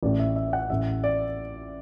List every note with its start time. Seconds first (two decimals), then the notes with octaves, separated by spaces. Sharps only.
0.03 A1 A2 A3 D5
0.19 E5
0.36 E5
0.53 F#5
0.70 A1 A2 A3 E5
1.04 D5